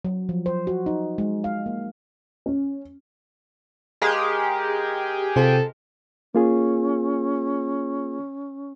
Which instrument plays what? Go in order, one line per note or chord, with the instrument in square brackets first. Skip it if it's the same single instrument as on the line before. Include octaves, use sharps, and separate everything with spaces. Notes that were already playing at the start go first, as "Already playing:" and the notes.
[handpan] F#3
F3
C5
F#4
D#4
G#3
F5
A#3
[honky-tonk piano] C#4
[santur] G#3 A#4 F5 [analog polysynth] G4 G#4
[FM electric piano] C3 F4 C5 [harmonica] A4
[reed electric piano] A#3 F4 G#4 [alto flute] C#4